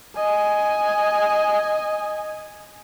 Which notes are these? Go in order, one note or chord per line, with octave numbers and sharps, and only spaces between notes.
D#5 G#5